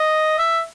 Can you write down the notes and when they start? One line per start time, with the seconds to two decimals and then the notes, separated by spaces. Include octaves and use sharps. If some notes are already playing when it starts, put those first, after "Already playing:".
Already playing: D#5
0.39 E5